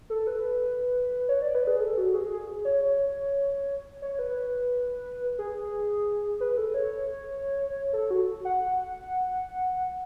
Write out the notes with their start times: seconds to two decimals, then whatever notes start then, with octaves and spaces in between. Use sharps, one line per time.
0.10 A4
0.27 B4
1.28 C#5
1.42 D5
1.55 B4
1.67 G#4
1.80 A4
1.98 F#4
2.14 G#4
2.31 G#4
2.65 C#5
2.83 C#5
4.02 C#5
4.19 B4
5.39 G#4
6.40 B4
6.57 A4
6.74 C#5
7.93 A4
8.11 F#4
8.45 F#5